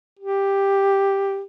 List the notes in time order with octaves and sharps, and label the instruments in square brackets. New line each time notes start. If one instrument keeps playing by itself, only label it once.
[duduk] G4